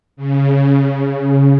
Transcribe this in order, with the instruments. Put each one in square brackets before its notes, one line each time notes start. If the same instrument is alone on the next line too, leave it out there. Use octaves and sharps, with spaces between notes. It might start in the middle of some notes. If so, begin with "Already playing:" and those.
[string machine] C#3